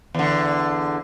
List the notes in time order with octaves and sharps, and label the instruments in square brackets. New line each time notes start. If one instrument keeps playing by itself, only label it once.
[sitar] E2 D3